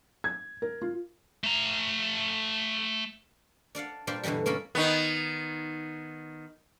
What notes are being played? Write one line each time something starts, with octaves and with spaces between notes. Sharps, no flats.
G#6
A#4
F4
A3 A#5
D4 D5 F5 F#5
A#2 G3 D4 F4 C5 D5
G2 B2 D3 E3 G3
A#3 C#4 A4 A#4 B5
D#3 B3